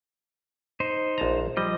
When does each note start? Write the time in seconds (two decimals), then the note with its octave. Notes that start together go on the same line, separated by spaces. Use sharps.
0.80 D#4 C5
1.18 A#1 A5 A#5
1.57 F3 G3 D#5